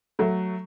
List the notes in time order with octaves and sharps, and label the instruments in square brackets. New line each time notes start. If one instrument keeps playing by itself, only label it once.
[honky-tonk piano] F#3 A3